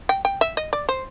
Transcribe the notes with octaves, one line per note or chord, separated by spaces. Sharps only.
G5
G5
E5
D#5
D5
C5